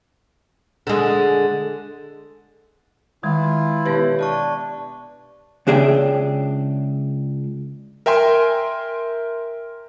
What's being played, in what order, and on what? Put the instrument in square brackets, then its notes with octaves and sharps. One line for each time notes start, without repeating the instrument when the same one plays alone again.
[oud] D3 G#3
[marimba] D#3 G#3 [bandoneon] E3 E4 F4
[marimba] B2 B3 B4 [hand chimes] G4 C#5 E5
[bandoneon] D4 [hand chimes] D5 A5 C#6
[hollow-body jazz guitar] C#2 C#3 D4 G#4 E5 G5
[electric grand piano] A#4 E5 G5 G#5 C6